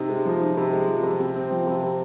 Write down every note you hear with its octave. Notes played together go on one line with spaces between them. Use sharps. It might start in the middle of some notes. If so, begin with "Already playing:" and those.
Already playing: C3 D#4
G#3
F3
D#4
C3
G#3
F3
C3
C3
C4
F3
C3
C3